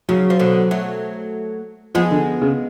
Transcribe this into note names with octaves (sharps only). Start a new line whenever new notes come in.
C#3 F#3
F3
B2 D3
F#3 A3
F3 G#3 B3
D3
C#3